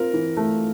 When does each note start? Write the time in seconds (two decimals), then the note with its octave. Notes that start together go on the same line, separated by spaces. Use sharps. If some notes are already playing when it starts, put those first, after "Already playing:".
Already playing: C4 F4 A#4
0.13 E3
0.37 A3